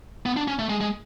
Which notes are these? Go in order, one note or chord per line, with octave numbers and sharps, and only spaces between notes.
B3
D4
C#4
A3
G#3
G#3